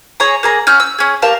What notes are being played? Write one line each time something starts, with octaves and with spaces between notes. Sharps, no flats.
G#4 C#5 A#5
A#3 G#4 A#5
C#4 F#5 F6 G6
E6
C#4 G#4
G4 A#4 F5 A5